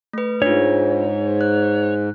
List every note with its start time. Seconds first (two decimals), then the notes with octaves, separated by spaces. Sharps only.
0.13 A3 B4
0.42 G#2 D4 F4 C#5
1.41 F#6